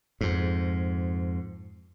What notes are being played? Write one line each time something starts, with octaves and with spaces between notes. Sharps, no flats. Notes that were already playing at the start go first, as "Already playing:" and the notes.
F2 G#2